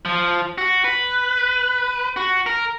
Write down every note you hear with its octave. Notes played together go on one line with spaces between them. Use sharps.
F3
F#4
B4
F#4
A#4